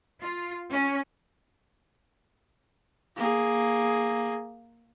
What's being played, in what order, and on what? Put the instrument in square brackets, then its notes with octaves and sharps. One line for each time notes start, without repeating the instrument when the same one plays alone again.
[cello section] F4
C#4
[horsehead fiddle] A#3 G#4